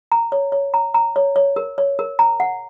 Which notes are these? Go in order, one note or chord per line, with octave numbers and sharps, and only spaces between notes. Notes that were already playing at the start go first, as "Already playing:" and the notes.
A#5
C#5
C#5
A#5
A#5
C#5
C#5
A#4
C#5
A#4
A#5
F#5